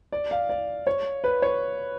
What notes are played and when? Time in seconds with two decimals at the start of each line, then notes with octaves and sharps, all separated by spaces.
0.12 D5
0.31 F5
0.49 D5
0.87 C#5
1.24 B4
1.42 C#5